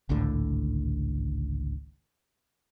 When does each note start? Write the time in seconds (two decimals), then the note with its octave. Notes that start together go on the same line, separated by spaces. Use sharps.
0.09 G#1 C#2 A2 D3